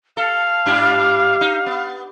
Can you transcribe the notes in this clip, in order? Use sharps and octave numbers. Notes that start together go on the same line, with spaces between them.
A4 F5
G#2 D4 G4
D#4
B3